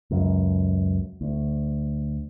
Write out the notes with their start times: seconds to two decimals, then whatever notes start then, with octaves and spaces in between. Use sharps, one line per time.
0.11 C#2 F#2
1.21 D2